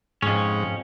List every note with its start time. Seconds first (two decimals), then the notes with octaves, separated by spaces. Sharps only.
0.22 F2 G#2 C#4